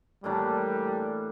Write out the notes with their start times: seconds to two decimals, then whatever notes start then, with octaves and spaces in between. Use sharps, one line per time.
0.24 A2 E3 G3 A#3 D4